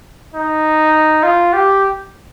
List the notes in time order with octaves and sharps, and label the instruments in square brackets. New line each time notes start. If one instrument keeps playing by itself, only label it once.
[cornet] D#4
F4
G4